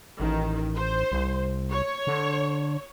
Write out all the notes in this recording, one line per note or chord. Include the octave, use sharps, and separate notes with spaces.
A1 D#3
C5
C2
C#5
D3